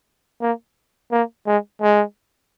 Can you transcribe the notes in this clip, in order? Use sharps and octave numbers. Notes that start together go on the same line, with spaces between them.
A#3
A#3
G#3
G#3